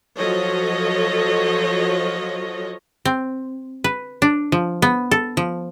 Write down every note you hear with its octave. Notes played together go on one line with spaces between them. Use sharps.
F3 F#3 A4 C#5 D#5
C4
B4
D4
F3
B3
A4
F3